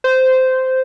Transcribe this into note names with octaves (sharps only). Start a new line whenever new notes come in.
C5